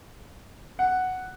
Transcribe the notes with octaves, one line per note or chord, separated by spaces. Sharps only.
F#5